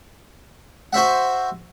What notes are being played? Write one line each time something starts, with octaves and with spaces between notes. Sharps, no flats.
F#4 C5 E5 F#5